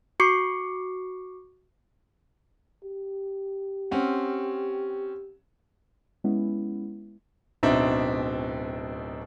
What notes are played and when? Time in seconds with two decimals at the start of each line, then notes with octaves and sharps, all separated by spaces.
0.20 F#4 C#6 D6 C7 C#7
2.84 G4
3.91 C4 C#4 F#5
6.24 G#3 B3 C#4 E4
7.63 D1 B2 C4 D4 D#4 E5